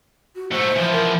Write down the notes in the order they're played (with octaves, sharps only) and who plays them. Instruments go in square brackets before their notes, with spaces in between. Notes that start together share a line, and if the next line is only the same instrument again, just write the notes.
[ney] F#4
[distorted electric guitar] G#2 A3 [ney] C5
[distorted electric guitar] E2 F3
[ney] A#4